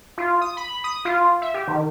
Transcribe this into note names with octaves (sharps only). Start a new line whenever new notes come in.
F4
D#6
B5
D#6
F4
E5
G4
D#3